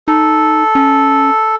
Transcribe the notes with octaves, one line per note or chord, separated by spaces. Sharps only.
D#4 A4
C#4